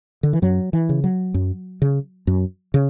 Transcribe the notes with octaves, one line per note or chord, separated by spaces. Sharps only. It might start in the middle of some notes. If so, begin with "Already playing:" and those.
D3
E3
F#2 F#3
E3
C#3
F#3
F#2
C#3
F#2
C#3